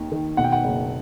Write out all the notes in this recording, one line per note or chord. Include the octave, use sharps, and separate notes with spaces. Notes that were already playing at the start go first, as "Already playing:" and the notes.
Already playing: D#2 D#3
D#3
B2 F#5
G5
F#5
F#1